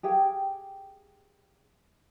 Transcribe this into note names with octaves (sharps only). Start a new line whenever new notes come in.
G4 G#4 F5 G5